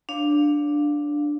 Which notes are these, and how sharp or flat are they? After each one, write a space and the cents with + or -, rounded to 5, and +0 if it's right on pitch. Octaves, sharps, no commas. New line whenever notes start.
D4 +0 C#5 +20 F5 +10